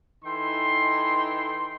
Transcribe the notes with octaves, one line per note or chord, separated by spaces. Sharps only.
E3 D#4 A4 G5 C6